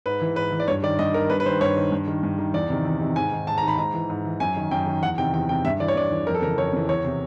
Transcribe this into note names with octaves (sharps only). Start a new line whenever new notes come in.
G#2 B4
E3
G#2 B4
E3
D5
G2 C#5
D#3 D5
G2 D#5
D#3 A#4
G2 B4
B4
D#3 C5
G2 C#5
D#3
G2
D#3
G2
D#3
E2 D5
C3 D#3
E2
C3 D#3
G#2 G#5
D#3
G#2 A5
A#5
D#3
B5
G#2 A#5
E3
G#2
E3
F#2 G#5
D#3
F#2 G5
D#3
E2 F#5
C3 D#3 G5
E2 G5
C3 D#3 G5
G2 E5
E3 D5
C#5
G2 D5
E3
F2 A#4
A4
C#3 E3 A#4
F2 C#5
C#3 E3
E2 C#5
C3 E3